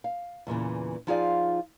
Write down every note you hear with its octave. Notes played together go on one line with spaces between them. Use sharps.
F5
E2 A#2 C#3 E3
F3 D#4 F4 G#4 D5 F5